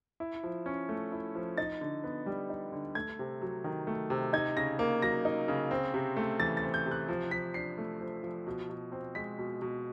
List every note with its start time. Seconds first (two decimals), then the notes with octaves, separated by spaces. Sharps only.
0.20 E4
0.43 F3
0.66 C#4
0.89 A3
1.12 E4
1.35 F3
1.58 D#4 A6
1.81 D3
2.04 B3
2.26 G3
2.50 D#4
2.72 D3
2.95 A3 G#6
3.19 C3
3.41 F#3
3.64 D#3
3.87 A3
4.10 C3
4.33 D#4 G#6
4.56 C#3 A#6
4.79 A#3
5.02 F#3 A#6
5.25 D#4
5.48 C#3
5.71 C4
5.94 C3
6.17 A3
6.40 E3 A6
6.57 A6
6.63 C4
6.74 G6
6.86 C3
6.91 F#6
7.08 F3
7.31 F3 B6
7.54 D4 C7
7.78 A3
8.00 F3
8.23 F3
8.47 B2
8.69 B2
8.92 C4
9.15 G#3 B6
9.38 B2
9.62 B2